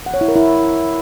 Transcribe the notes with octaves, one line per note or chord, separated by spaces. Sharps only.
F#5
C#5
E4
A#4
E4